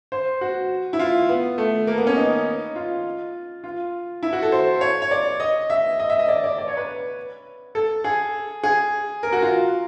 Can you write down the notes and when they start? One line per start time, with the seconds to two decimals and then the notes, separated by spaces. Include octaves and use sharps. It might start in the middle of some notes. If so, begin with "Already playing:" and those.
0.12 C5
0.41 F#4
0.93 E4
0.99 F4
1.29 B3
1.58 A3
1.87 A#3
1.98 B3
2.07 C#4
2.16 D#4
2.76 F4
3.64 F4
4.23 E4
4.33 F#4
4.42 A4
4.52 C5
4.81 C#5
5.02 C#5
5.11 D5
5.40 D#5
5.70 E5
5.99 D#5
6.10 E5
6.19 D#5
6.28 D5
6.44 D5
6.58 D5
6.68 C#5
6.77 B4
7.75 A4
8.04 G#4
8.64 G#4
9.23 A#4
9.33 F#4
9.42 F4